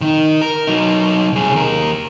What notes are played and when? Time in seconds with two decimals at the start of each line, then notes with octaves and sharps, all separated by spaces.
0.01 D#3 D#4
0.41 A#4
0.67 F#3 D#4
1.32 C2 G#4
1.54 D#2 A#4